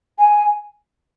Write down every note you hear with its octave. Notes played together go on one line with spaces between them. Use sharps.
G#5